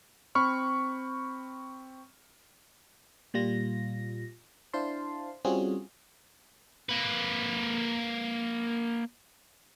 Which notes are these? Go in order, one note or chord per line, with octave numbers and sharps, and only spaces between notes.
C4 B5 C#6 F6
A#2 G3 F4 A#6
D4 E4 C5 F5 A5 C6
G3 C4 C#4 F4 F#4 G#4
A#3 B4